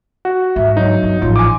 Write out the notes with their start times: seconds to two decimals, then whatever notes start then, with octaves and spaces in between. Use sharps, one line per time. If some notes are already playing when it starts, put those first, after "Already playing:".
0.25 F#4
0.56 G#2 E5
0.77 F#3 D#4
1.03 G1
1.22 A1 F3 F4
1.36 G#5 D6